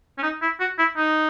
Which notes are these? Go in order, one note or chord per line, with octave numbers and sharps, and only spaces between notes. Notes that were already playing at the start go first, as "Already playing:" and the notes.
C#4
D#4
E4
F#4
E4
D#4